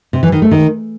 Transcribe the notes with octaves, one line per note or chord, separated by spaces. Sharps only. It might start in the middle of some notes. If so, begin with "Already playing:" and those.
C3
E3
D#3
A3
D#3